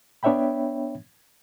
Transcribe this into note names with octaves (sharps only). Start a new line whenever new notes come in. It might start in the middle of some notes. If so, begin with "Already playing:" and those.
B3 D4 C#5 E5 G5 B5